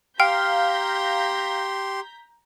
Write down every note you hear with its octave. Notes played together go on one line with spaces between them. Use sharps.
G4 F5 G5 A#5 C6 G6 B6